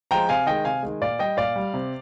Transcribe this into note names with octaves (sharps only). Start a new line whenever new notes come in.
F3 G#3 G5 A#5
C3 F5 G#5
D#3 G#3 D#5 G5
C3 F5 G#5
D#3 G#3
A#2 D5 F5
G3 D#5 G5
A#2 D5 F5
G3
C3